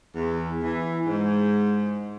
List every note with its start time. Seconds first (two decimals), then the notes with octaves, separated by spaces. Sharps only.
0.15 E2
0.62 E3
1.06 G#2